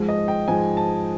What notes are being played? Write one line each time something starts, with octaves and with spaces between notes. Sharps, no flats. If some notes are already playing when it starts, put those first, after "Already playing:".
Already playing: G#2 F3 G#3
D#5
G5
G#2 F3 G#3 G#5
A5